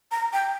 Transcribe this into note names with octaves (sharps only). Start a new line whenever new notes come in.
A#5
G5